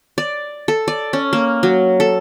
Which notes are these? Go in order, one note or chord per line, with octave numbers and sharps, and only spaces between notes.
D5
A4
D5
C#4
A#3
F#3
A4